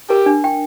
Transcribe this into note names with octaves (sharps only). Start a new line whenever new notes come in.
G4 A#4
D4
G5